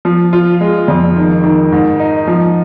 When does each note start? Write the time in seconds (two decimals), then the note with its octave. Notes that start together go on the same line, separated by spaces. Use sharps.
0.05 F3
0.33 F4
0.61 G#3
0.88 F2
1.16 D#3
1.44 D#3
1.72 G#2
2.00 D#4
2.27 F3